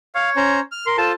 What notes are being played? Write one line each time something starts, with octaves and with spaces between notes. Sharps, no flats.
C#5 F5
C#4 C5 A#5
F6
A#4 C6
F4 A4 C5 A5